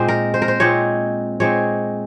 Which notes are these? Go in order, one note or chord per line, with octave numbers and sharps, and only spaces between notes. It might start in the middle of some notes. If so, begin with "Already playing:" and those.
Already playing: A#2 G#3 C4 D#4 C5
A#4
C5
A#4
C5
A#2 G#3 C4 D#4 C#5
A#2 G#3 C4 D#4 C#5